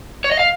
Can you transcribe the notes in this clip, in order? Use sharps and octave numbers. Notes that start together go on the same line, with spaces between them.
C#5
D#5
F5